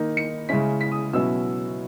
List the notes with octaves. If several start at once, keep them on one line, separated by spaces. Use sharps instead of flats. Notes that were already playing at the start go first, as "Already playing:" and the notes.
Already playing: D#3 A#3 D#4
C#7
C#3 G#3 C#4 E4 B6
B6
D#6
B2 F#3 C#4 E4 E6